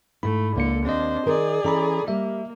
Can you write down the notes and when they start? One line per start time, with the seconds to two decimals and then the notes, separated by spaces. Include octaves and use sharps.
0.23 G#2 A3 E4 B5
0.56 C#2 D3 A#3 A4 C#7
0.85 D#2 C4 D4 C5 D#5
1.26 D#3 G#4 A#4 D5
1.64 E3 C#4 A4 A#5 B5
2.08 G3 A#3 E5